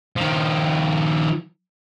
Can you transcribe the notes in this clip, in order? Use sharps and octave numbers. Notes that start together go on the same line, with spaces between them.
D#3 F3